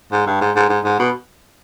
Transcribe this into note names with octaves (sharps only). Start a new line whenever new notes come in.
G#2
G2
G#2
G#2
G#2
G#2
B2